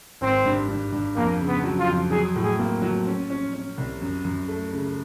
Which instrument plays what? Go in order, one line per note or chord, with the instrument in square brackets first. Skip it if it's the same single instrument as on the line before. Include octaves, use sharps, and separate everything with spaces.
[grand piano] G#1 [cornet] C4
[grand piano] G2
G2
G2
[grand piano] F2 [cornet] A#3
[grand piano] C#3
[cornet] B3
[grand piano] F#3
[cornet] F4
[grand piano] F2
[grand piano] F#3 [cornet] G#4
[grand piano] A2
[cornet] G#4
[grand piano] A#3
F#3
C#4
C#4
C#4
C2
F#2
F#2
A3
C#3